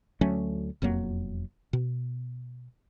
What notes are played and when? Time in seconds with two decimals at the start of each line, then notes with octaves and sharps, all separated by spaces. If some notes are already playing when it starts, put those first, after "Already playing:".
0.21 D2 F#3 A3 C#4
0.82 E1 F2 F#3 A#3
1.73 B2